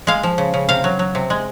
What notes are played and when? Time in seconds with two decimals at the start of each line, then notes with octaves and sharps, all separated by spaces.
0.07 G#3 F5
0.23 F3
0.38 C#3
0.54 C#3
0.69 C3 F5
0.84 F#3
0.99 F#3
1.15 C3
1.30 G#3